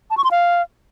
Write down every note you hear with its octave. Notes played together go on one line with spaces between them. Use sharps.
A5
C#6
C6
F5